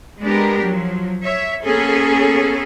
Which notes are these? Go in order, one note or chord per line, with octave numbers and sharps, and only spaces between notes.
G#3 B3 D4 G4 A#4
F3 F#3
C#5 E5
A#3 B3 C#4 G#4 A4